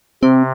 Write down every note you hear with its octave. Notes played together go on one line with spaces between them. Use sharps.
C3 C4